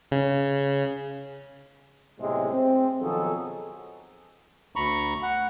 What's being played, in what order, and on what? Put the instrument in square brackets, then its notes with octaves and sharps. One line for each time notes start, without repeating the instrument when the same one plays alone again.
[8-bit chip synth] C#3
[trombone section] B1 A2 C3 G#3
C4
B1 D#3 F3 F#3 G#4 A4
[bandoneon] D2 A#5 B5 C#6
F#5